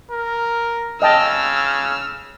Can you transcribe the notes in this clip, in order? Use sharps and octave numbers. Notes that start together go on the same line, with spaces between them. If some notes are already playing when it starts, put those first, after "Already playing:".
A#4
C#3 D#5 G5 A5 E6 F6